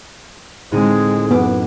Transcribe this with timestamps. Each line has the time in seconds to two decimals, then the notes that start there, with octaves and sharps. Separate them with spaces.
0.72 A2 D3 G#3 C4 D#4 G#4
1.31 F#2 B3 D6